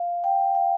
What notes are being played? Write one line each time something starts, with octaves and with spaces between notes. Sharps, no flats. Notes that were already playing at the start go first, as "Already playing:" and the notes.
Already playing: F5
G5
F5